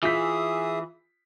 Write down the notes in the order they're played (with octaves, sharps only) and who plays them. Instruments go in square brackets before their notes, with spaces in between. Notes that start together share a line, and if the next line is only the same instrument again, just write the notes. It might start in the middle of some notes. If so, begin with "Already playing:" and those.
[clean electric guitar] E3 [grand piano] F4 B6 [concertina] G#4 E5 D#6